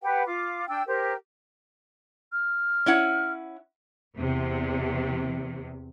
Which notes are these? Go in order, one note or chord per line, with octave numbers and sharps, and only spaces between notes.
G4 B4 F#5 G5
F4 D6
D4 G5 E6
G4 A#4 C5
F6
C#4 E4 F#5
E2 C3